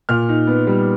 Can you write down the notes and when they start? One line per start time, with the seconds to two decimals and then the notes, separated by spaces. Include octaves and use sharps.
0.09 A#2 F6
0.29 D#4
0.47 B3
0.67 G3